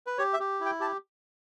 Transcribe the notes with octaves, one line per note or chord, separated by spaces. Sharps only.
B4
G4 C#5
E5
G4
E4
G5
G4 A5